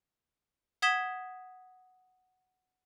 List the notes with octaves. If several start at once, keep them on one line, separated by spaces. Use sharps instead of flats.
F#5 D#6 G#6 B6 E7 G7